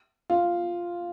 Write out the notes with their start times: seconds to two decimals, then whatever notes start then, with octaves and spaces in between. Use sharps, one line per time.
0.30 F4